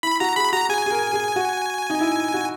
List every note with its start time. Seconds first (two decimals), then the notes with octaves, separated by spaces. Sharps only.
0.03 E4 B5
0.20 F#4 A#5
0.36 G#4 B5
0.53 F#4 A#5
0.69 G#4 G#5
0.86 G#4
0.91 A#4
1.13 G#4
1.36 F#4
1.90 D#4
2.01 E4
2.34 F#4